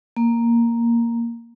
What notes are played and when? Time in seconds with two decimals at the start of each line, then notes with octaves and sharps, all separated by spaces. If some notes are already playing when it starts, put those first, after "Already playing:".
0.17 A#3